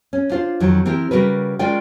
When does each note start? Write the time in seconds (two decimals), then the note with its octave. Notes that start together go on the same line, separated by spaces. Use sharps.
0.13 C#4
0.30 D4 F4 C5
0.60 F2 D#3 F3 F#3
0.86 E3 C4 G4 A#4
1.11 C#3 G3 F#4 A#4 B4
1.59 G#3 C#4 F4 A#4 D5 G5